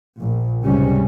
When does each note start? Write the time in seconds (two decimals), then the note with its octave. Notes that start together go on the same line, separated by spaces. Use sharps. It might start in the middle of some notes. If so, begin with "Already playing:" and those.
0.20 A#1
0.64 C#2 G#2 C3 G3 C#4